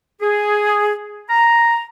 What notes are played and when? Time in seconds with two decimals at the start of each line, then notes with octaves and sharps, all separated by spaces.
0.21 G#4
1.30 A#5